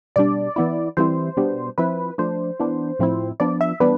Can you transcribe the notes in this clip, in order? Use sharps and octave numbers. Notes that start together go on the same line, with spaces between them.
B2 G3 D4 D5
E3 B3 E4
E3 G3 C4 E4 C5
B2 G3 B3 D4
F3 C4 E4 B4
F3 A3 D4 C5
E3 B3 D4
A2 F3 C4 E4
F3 B3 D4 D5
E5
E3 G3 B3 D4 B4